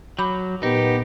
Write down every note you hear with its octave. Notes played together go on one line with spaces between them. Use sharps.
F#3 B5 D6 G6
A#2 B3 D#4 G4